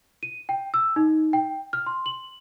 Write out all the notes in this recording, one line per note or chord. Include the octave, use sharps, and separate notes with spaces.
D#7
G5
E6
D#4
G5
F6
C6
F#7